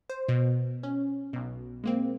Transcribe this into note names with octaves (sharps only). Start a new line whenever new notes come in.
C5
B2
C#4
B1 B2
G#3 A#3 C4